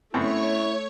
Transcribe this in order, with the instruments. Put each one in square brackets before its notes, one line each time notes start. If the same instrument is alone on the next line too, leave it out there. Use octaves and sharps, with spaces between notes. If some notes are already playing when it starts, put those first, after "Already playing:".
[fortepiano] F#2 B3 C4 [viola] A3 [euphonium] E4 [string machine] C#5 C#6